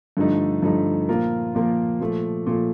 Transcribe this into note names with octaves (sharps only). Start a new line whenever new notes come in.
G2 D3 F3 A3 D#4
G2 D3 F3 A3 D#4
A#2 F3 A#3 F4 A#4
A#2 F3 A#3 F4 A#4
A#2 F3 A3
A#2 F3 A3